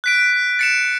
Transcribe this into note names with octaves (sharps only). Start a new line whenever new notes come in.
F#6 B6 D7
A6 C#7 E7